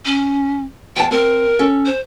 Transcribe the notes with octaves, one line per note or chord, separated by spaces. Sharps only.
C#4
E2 G5 A5
C4 A#4
C#4 A4
C5